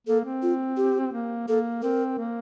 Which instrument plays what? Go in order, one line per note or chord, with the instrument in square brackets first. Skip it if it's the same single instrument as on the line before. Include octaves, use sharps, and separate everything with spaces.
[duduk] A#3 [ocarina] A4
[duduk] C4
[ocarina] F4
G4
[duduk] A#3
[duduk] A#3 [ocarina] A4
[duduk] C4 [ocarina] A#4
[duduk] A#3